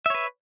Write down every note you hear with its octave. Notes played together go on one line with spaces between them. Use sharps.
B4 C#5 E5